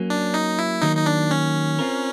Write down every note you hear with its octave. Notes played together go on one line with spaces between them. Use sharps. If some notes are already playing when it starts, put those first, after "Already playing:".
Already playing: F#3 A#3 C#4
D4
D#4
E4
D#3 F#3 A#3 D#4
D#4
D4
C#4
C4 F4 A#4